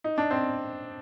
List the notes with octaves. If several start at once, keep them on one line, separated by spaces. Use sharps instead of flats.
D#4
D4
C4